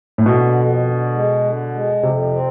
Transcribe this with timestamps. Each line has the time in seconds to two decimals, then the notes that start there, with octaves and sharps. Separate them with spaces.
0.18 A2
0.26 B2 D3
0.55 F2
0.84 D3
1.14 G#3
1.44 D3
1.74 G#3
2.02 F2 C3
2.32 C4